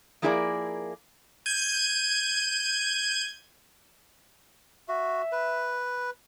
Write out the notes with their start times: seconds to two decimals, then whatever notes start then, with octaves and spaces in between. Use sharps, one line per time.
0.22 F3 A#3 E4 G#4 A#4 D5
1.46 G6 G#6 D#7
4.89 F#4 E5
5.32 B4